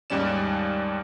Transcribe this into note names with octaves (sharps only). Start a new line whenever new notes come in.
D#2 G#2 G3 C#4 D5 E7